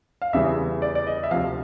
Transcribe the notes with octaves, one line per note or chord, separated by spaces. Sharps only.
F5
E2 C#3 E3 G3 E5
D5
D5
D#5
E5
D2 C3 F3 F5